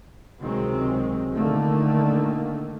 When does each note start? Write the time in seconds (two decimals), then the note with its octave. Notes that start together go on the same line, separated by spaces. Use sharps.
0.40 C#2 C3 D#3 F#3 G#3 C4
1.34 A#2 D3 D#3 A3 A#3